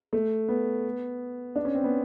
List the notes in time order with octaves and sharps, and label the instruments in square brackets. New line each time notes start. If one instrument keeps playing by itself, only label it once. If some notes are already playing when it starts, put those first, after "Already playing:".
[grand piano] A3
B3
D4
C#4
C4
B3